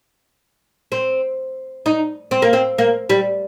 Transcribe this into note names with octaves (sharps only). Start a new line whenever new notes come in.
C4
D#4
C4
A#3
C4
A#3
G3